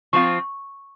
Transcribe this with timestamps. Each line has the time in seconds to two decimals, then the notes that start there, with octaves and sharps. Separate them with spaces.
0.13 F3 C4 F4 C#6